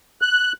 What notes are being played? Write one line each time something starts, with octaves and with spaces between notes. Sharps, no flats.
F#6